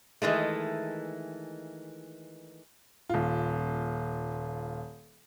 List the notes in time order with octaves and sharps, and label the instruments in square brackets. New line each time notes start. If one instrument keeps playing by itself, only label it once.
[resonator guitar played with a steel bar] D#3 E3 G#3 A3
[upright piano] D#1 F4